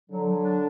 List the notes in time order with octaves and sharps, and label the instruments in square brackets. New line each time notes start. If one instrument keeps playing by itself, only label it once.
[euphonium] D3 [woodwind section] F#3
[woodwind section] F#3
D4